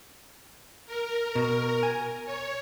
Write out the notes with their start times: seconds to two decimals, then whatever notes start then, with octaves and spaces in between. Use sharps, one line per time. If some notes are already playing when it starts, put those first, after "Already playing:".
0.86 A#4
1.35 B2
1.83 G#5
2.25 C#5